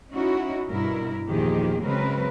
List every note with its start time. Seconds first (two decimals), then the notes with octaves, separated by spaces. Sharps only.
0.10 C#4 D#4 E4 F#4
0.69 G2 B2 E4 A#4
1.28 E2 A#2 D#3 F3 G4 G#4
1.81 C#3 F#3 G#3 C4 A#4 B4